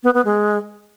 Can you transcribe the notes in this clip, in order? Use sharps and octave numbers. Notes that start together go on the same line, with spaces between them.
B3
B3
G#3